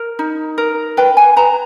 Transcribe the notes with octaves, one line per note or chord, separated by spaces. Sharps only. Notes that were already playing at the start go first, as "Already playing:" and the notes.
Already playing: A#4
D#4
A#4
B4 G5
G#5
B4 A#5